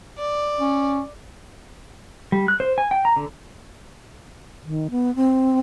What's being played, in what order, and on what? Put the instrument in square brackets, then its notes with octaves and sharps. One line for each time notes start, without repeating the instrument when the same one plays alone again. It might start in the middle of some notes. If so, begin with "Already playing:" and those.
[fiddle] D5
[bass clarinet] C#4
[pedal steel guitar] G3
F#6
C5
G#5
G5
A#5
D3
[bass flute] D#3
B3
C4